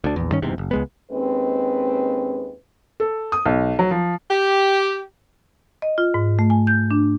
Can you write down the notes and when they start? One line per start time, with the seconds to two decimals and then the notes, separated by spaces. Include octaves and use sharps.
0.04 D2 D4
0.16 A#1 E2
0.31 G2 D#3 C#4
0.42 F#1 E2 G#2 C3
0.58 F#1
0.71 C#2 G#3 B3
1.11 D#2 G#3 C4 C#4 B4
3.00 A4
3.32 D#6
3.46 B1
3.79 F#3
3.91 F3
4.31 G4
5.82 D#5
5.98 F4
6.14 G#2
6.39 A3
6.50 G#5
6.67 G6
6.91 D4